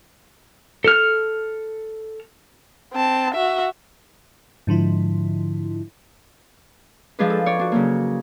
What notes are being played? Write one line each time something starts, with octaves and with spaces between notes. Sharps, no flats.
A4 F6
C4 A5
F#4 E5
G#2 D3 F3 E4
F3 G#3 D4 F4 G#4 B4
A4
C#5 D5
D4 F#4
C#3 F#3 A#3